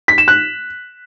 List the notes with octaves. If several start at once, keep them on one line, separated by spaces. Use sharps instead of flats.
B6
E7
F#6